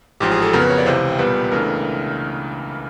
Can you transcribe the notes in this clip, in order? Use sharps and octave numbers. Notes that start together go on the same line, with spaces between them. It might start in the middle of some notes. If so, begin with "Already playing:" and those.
A1 G#2 F3 G4
G#4
A4
F2 C#3 F#3 B3 A#4
B4
C#5
D5
C#2 C3 E3 C5
B1 A#2 G3 B3 B4
B4
C#2 C#3 E3 A3 D4 A#4